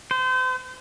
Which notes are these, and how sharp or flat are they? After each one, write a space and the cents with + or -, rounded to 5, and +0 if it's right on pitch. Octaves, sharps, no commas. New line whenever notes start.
C5 -35